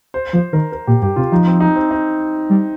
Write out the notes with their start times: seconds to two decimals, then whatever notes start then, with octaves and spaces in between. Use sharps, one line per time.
0.14 C5
0.33 F3 C5
0.53 D#3 A#4
0.72 A#4
0.87 A#2 G4
1.02 G2 G4
1.16 C3 F4
1.32 F3 D#4
1.47 C4
1.60 D#4
1.76 C4
1.91 D#4
2.50 G3